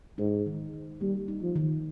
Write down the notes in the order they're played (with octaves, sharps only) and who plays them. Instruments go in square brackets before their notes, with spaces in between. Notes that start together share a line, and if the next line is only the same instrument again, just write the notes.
[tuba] G#2 [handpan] D#4
[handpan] D#3
D#3
[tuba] G3 [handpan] A#3
[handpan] D#4
[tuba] F3
[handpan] D#3